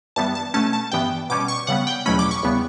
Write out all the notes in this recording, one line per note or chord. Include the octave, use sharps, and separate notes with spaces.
G2 E3 G3 B3 A5
A5
B2 A3 C#4 A5
A5
G2 E3 B3 G5
B2 G3 C#4 D6
C#6
C#3 G3 B3 F#5
G5
E2 B2 F#3 A3 C#4 B5
D6
C#6
E2 C#3 G3 B3